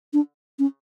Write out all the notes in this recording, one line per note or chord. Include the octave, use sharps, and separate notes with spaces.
D4
C#4